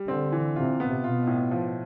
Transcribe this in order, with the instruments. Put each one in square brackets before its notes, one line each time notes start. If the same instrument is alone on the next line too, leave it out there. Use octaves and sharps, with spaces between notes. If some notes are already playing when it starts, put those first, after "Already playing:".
Already playing: [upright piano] G3
[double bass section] D3 [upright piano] C4
[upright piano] E3
[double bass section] C3 [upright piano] F4
[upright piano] B3
[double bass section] B2 [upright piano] F4
[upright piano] A2
F3